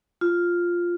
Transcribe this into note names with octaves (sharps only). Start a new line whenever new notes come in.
F4